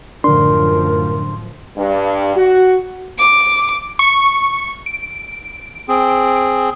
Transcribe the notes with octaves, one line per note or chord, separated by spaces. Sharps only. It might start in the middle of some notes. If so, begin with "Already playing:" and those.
F#2 A2 D3 F3 D4 A#4 C6
G2
F#4
D6
C#6
D7
C4 G#4